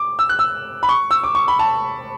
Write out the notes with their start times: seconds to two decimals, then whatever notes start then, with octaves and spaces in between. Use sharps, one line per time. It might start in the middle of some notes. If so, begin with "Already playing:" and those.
Already playing: D6
0.19 E6
0.29 F#6
0.39 E6
0.83 B5
0.89 C#6
1.11 E6
1.23 D6
1.35 C#6
1.48 B5
1.59 A5